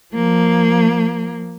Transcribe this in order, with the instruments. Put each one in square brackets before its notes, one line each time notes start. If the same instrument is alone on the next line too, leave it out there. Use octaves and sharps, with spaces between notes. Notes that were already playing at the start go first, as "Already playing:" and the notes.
[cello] F3 A#3